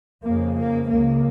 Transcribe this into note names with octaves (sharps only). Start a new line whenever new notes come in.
F2 C#3 A#3
A#3
C#2 C#3 A#3